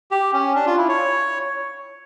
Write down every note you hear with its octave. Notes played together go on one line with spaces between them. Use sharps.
G4
C#4
D4
F4
E4
C#5